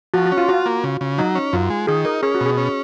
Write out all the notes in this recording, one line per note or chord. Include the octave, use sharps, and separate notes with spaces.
F3 F#4
F#4
C#4
F4
F4 F#4
A#3
C#3
C#3
F#3 D#4
C#4
F#2 F4
G#3
D#3 G#4
D#4 A#4
C#4 G#4
F#4
B2
G#4
C#4